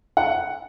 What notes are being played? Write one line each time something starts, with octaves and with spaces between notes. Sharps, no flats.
F#5